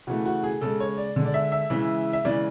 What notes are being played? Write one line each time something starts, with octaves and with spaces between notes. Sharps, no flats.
C#3 E3 A3 F#4
F#4
G#4
C#3 G#3 A4
C#5
D5
D3 G#3
D5
E5
E5
C#3 E3 G#3
E5
C#3 E3 G#3 D5